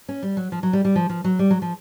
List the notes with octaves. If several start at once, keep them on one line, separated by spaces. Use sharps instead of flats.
C#4
G3
F#3
F3
F#3
G3
G3
F3
F3
F#3
G3
F#3
F3